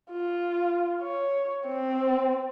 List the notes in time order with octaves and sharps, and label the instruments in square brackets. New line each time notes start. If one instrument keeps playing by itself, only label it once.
[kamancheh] F4
C#5
C4